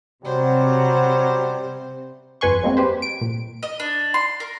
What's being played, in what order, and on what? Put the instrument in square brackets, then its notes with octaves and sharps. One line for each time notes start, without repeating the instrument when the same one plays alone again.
[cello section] C3 [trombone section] F#3 [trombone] G3 [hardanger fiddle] C5
[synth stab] G1 F2 B4 G#5 C6 C#6
F#3 G#3 A#3 C4
G4 B4 C5
D7
A#2
[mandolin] D#5
D4
C6
A#4